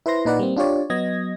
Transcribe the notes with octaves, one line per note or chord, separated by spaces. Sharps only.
E4 B4 C5 C6 A#6
A#2 D#4 B4 D5 F#5
G3 A#3 C4
D4 F4 G4 C#5 D5
F#3 B3 D#5 G#6 A#6